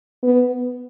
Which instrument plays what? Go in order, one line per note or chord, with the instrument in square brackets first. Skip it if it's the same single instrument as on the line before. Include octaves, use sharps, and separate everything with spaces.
[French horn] B3